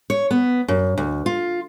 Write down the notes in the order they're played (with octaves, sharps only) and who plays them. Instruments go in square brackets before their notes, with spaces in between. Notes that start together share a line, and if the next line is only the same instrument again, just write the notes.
[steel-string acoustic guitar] C#5
B3
F#2
D2
F4